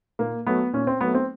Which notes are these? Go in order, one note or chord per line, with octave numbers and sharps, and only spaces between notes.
A#2 A#3
F#3 A3 B3
A#2 C#4
C4
F#3 A3 B3
C4